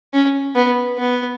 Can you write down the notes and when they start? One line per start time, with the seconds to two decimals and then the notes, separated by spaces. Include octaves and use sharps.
0.13 C#4
0.55 B3
0.98 B3